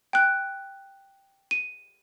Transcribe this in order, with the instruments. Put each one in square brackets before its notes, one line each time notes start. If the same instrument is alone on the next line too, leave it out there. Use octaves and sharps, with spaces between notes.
[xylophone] G5 F#6
D#7